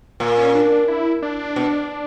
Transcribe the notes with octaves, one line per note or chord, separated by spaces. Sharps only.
A#2 A#3
C#4
D4
D4
E4
D4
B2